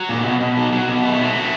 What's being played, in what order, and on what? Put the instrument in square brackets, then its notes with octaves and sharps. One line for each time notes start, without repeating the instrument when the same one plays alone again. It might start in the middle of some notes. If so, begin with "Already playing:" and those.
Already playing: [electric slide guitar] F#3
A#2
B2
B2
F#3
F#3
B2
A3
F#3
A3